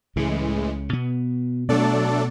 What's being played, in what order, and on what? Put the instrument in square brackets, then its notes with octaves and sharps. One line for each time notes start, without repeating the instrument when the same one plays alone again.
[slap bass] C#2 C#3 [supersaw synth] A2 E3 G#3
[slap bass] B2 B3
[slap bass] B2 B3 [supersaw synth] F#3 A3 D4 A4 D5